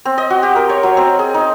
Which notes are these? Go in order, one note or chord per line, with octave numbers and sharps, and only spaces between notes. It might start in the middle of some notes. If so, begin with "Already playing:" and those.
C4
D#5
F#4
G4
A#4
C#5
F#3
C4
G#4
D#4